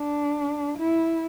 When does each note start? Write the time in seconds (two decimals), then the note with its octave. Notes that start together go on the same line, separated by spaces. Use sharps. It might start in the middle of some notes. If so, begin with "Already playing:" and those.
Already playing: D4
0.78 E4